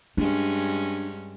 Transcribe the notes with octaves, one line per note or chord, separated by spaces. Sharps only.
G2 G#3 C#4 D4